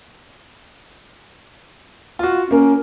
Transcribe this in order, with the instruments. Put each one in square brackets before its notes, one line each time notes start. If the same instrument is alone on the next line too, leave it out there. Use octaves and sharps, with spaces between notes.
[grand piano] F4 F#4
[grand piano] A#3 A#4 [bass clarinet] C#4